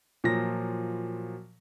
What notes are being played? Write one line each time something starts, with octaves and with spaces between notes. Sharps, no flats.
A#2 F3 F#3 A#6